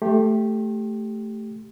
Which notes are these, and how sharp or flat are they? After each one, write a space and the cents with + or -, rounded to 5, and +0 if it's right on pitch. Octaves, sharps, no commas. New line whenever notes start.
A3 +0 G4 +0 C6 +35